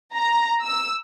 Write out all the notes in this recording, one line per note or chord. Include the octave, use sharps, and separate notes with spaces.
A#5
E6